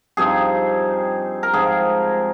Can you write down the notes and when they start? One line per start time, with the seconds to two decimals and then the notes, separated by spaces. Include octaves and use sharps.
0.17 G2 F3 C4 D#4 G#4
1.43 A#4
1.53 G#2 F3 C4 G#4